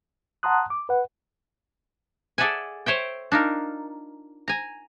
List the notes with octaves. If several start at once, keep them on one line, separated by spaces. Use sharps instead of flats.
F#5 A5 A#5 C6 D#6 F#6
D6
B4 F#5
G#4 A4 D5 E5 F#5 G#5
C5 C#5 E5 G5
D4 D#4 F4 A#4
G#5 A#5